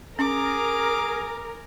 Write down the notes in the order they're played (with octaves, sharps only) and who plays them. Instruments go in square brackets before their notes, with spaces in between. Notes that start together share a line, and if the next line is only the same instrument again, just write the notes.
[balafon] C#4 [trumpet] G#4 [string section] A#4 [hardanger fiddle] D6